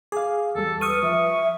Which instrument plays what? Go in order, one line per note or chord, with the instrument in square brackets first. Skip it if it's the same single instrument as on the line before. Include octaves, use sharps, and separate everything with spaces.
[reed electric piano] G#4 F5 [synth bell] D6
[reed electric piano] E2 G3 [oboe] A4
[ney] B4 [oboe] C#6 [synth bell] D#6 F6 D#7
[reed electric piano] F3 [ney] E5